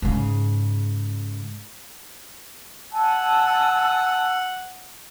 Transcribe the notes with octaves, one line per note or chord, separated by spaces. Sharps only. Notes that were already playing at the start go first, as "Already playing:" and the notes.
G#2 C#3
F#5 G#5 A5 E6